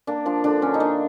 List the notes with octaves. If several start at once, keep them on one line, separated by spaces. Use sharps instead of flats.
A#3 D4
F3 D4
D3 D4
D3 C#4
D#4
A#3 D4